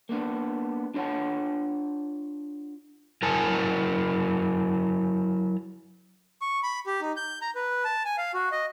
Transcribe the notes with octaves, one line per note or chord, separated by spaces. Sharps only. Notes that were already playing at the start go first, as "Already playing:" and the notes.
A#3 B3 D4
D4 F4 C#5 D#5 F#5 A5
F#3 E4 A#4 G#5 A5
C#6
B5
G4
D#4
G6
A#5
B4
A5
G#5
F5
F#4
D#5